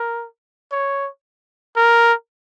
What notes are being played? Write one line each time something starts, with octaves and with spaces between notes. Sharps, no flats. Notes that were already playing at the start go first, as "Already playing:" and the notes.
Already playing: A#4
C#5
A#4